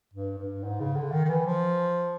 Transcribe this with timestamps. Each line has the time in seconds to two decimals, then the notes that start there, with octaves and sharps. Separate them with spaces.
0.14 G2
0.38 G2
0.63 G#2
0.80 C#3
0.96 D3
1.12 D#3
1.25 D#3
1.29 E3
1.46 F3